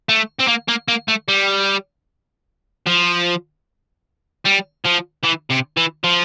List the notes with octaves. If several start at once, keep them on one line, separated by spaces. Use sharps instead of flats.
A3
C4
A#3
A#3
A#3
A3
G3
F3
G3
F3
E3
C3
E3
F3